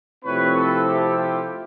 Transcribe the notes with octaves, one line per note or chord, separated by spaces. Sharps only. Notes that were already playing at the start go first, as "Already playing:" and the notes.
C3 F3 A3 C4 E4 B4 C#5
A4 B4
G4 A4
F4 G4